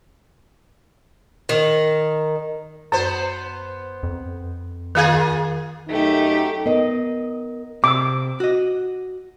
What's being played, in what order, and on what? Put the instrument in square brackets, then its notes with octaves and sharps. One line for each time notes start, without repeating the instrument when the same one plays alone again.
[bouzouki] D#3
[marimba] F#2 [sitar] B3 C5
[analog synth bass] F2
[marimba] D#3 F5 G#6 [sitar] A#3 F4 G#4
[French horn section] F#2 D#4 [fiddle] A3 G4
[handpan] B3 D#5 [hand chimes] A#4
[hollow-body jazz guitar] C3 [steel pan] D6 E6
[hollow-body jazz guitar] F#4 D#5